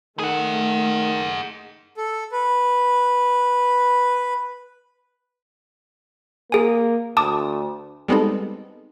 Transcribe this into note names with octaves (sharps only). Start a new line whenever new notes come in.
D#3 A3 G#4 F#5
A4
B4
A#3 G#4 G#5
D2 A5 D6 D#6
G3 G#3 B3 C4 D#4 A4